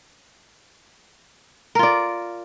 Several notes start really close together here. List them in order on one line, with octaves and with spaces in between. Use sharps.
A#4 F4 D5